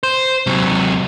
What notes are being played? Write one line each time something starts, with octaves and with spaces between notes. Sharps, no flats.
C5
C3 F#3